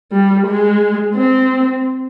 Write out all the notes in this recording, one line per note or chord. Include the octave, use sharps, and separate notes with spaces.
G3
G#3
C4